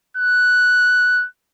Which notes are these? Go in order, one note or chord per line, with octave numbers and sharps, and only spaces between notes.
F#6